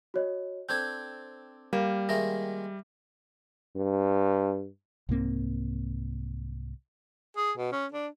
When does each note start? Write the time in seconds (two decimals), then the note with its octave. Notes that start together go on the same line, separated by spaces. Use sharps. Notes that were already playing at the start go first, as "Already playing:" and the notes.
0.14 F#4 C#5 D#5
0.69 C4 D4 A4 G6 G#6
1.73 G3 A#3
2.09 D#3 G#3 A#4 E5 A#6
3.76 G2
5.09 C2 G#2 A#3 C4
7.37 G#4
7.57 B2
7.72 C#4
7.92 D4